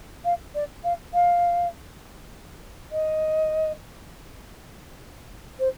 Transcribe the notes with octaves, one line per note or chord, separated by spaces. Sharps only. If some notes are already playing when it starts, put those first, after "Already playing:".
F5
D5
F5
F5
D#5
C5